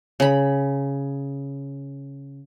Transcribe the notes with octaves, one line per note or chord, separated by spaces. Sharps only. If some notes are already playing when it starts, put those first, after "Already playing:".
C#3 B5